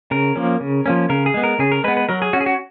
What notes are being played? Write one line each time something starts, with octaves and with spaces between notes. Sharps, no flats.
C#3 A#4
F3 A#3 C#4
C#3
F3 A#3 C#4
C#3 A#4
G#4
G#3 B3
A#4
C#3 G#4
A#4
G#3 B3 B4
B4
F#3 A#4
G#4
C#4 F#4
G#4
F#4